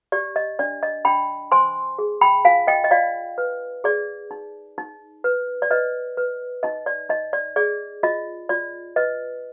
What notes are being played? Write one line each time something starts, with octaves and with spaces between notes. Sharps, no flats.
G4 D5
D#5
D4 D5
D#5
D4 G5 B5
C5 G#5 C6
G#4
G5 B5
F4 F5 G#5
D#5 G5
D#5
F4 D5 F5
B4
G#4 D5
D#4
D#4
B4
D5
B4 D#5
B4
D#4 D#5
D5
D#4 D#5
D5
G#4 D5
F4 D#5
F4 D5
B4 D#5